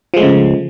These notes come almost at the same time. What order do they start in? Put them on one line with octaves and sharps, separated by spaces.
F3 G#3 A3 C#3